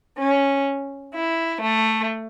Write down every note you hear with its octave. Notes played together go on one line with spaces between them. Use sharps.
C#4
E4
A3